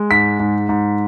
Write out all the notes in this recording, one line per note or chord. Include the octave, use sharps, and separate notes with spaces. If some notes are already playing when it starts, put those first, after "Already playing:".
Already playing: G#3
G#2 B6
G#2
G#2